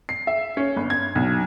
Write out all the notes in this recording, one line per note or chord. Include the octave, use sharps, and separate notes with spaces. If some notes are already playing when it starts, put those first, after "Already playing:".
C7
E5
C#4
G1
G#6
B1